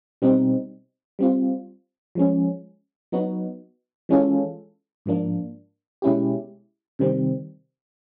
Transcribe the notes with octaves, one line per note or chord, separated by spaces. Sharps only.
B2 G3 C4 D#4
G3 C4 F4
F3 G#3 C#4
F#3 B3 D#4 F#4
E3 G#3 C#4 F4 A4
G#2 F3 A#3 D4
B2 G#3 C#4 E4 G4
C3 D#3 G3 C4